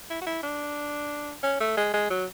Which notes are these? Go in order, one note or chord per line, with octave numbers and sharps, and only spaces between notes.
E4
F#4
E4
D4
C#4
A3
G#3
G#3
F#3